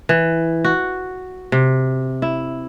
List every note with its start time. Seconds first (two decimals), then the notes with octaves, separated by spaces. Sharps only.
0.09 E3
0.65 F#4
1.52 C3
2.22 E4